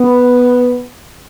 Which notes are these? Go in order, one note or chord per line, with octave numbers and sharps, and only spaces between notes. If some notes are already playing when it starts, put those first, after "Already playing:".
Already playing: B3